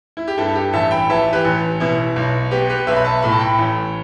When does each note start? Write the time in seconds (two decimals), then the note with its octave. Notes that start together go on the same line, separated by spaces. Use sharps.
0.17 E4
0.28 G4
0.38 G2 E4 A4
0.55 G4
0.73 A1 E5 A5
0.91 G5 B5
1.10 E3 E5 A5
1.33 G4 B4
1.45 A1
1.80 B2 E4
2.16 B1
2.51 B3 G4
2.69 G4 B4
2.87 B1 B4 E5
2.96 B5
3.05 E5 A5
3.22 A2 B5
3.32 A5
3.39 G5 B5
3.58 A1